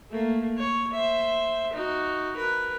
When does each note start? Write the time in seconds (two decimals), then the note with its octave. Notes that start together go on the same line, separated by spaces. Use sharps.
0.11 A3 A#3
0.57 C#5
0.93 C5 E5
1.73 D#4 F#4
2.36 A#4 B4